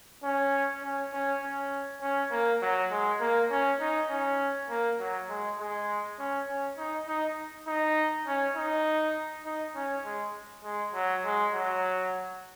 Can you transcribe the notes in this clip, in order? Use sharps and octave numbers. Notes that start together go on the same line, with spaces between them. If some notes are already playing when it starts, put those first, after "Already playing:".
C#4
C#4
C#4
C#4
C#4
A#3
F#3
G#3
A#3
C#4
D#4
C#4
A#3
F#3
G#3
G#3
C#4
C#4
D#4
D#4
D#4
C#4
D#4
D#4
C#4
G#3
G#3
F#3
G#3
F#3